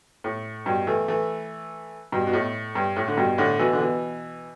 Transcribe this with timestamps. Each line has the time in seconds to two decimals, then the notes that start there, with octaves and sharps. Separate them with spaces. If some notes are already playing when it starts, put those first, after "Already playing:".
0.24 A2
0.66 G2 B2
0.87 E3 A3
1.08 E3 A3
2.12 G2 B2
2.27 B2
2.33 A2
2.75 G2
2.96 A2
3.08 D3
3.17 G2 B2
3.38 A2 D3
3.59 B2 E3
3.73 D3
3.80 B2 E3